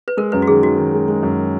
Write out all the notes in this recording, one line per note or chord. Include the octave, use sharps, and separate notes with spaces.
B4
G#3 A#4
F#2 B4
F#4
D#3 G#4
D#3 F#4
D#3
G#3
G#3
F#2